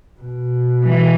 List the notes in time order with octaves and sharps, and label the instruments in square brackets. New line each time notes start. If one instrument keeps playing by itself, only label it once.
[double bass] B2
[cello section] E3